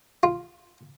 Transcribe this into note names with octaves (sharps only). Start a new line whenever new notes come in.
F4